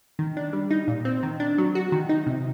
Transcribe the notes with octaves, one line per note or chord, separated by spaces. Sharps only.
D#3
D4
G3
D#4
A#2
C4
D#3
D4
F#3
F#4
D#3
D#4
C3